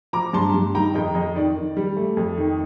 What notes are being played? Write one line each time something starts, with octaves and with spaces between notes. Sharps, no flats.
F3 A#5 D6
G2 A5 C6
G2
D#3 G5 A#5
F2 D#5 G5
F2 D#5
D#3 D5
D#3
G3
A3
F2
D#3